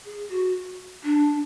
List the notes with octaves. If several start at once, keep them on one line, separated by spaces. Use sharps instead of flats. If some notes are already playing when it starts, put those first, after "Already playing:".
G#4
F#4
D4